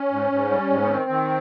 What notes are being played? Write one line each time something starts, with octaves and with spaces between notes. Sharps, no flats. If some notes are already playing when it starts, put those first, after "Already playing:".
Already playing: C#4
G#2
G#2
G3
G#2
B3
D#3 C4
D#3